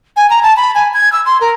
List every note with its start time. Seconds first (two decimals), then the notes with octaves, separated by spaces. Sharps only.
0.17 G#5
0.30 A#5
0.43 A5
0.57 B5
0.75 G#5
0.94 G#6
1.12 E6
1.26 C6
1.41 A#4